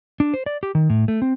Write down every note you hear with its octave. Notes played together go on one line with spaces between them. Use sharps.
D4
C5
D5
G4
D#3
A2
A3
C4